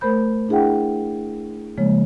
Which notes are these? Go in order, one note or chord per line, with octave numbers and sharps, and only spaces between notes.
A3 A#4 C5 B5 G6
D4 E4 G#4 E5 F#5 G5
C#3 F3 G#3 A#3 C#5